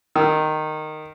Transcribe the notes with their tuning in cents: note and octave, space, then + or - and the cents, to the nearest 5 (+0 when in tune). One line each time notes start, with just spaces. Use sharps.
D#3 -10